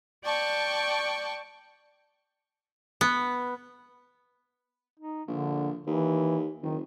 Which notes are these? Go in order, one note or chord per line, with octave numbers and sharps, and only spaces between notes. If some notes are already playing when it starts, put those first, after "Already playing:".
D5 G5 A5 C#6
B3
D#4
A#1 D3
D#2 E3
F#1 D#3